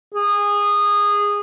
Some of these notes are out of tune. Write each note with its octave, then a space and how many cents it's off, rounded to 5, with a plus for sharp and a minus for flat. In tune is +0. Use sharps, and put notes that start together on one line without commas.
G#4 -20